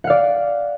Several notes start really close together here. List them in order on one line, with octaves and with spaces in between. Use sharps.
F#5 F5 D5